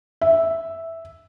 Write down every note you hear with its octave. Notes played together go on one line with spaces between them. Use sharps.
E5